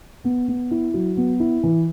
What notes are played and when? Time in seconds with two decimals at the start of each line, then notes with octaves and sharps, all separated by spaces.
0.24 B3
0.48 B3
0.71 E4
0.94 F#3
1.17 B3
1.40 E4
1.63 E3